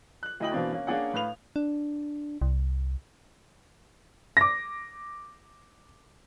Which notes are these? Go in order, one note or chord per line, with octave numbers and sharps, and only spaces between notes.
F#6 F#7
D2 E4 D#5 G5 F#7
B2 E3 A#3 C4 D4
A#3 C#4
A#3 C#4 D4 G#4 F#5
A2 B4 F5 F7
D4
C2
D6 A#6